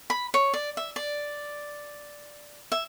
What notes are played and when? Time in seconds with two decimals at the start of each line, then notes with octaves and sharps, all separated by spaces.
0.10 B5
0.34 C#5
0.54 D5
0.77 E5
0.96 D5
2.72 E5